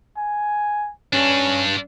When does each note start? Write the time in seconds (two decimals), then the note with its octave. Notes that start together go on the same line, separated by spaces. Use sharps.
0.17 G#5
1.13 G2 C#4 D4